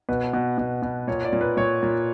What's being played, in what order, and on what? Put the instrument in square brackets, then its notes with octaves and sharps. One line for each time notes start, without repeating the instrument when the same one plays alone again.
[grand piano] B2 B4
B2
B2
B2
A#2 C#5
D5
A#2
B4
A#2 C#5
A#2